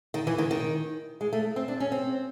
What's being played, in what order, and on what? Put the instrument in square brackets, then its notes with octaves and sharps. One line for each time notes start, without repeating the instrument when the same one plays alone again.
[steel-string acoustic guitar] D#3
E3
D#3
D#3
G#3
A3
C4
D4
C#4
C4